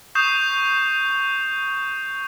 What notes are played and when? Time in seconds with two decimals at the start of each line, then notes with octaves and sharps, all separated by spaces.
0.15 C#6 D#6 G6 C7 E7 F7